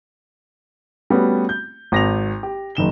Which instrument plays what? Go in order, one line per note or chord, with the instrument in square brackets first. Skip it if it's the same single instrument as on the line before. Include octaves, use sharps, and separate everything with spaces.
[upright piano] G3 A3 B3 C#4 F#4
G6
G#1 A#6 F7
G4
F#1 D#3 E7 G7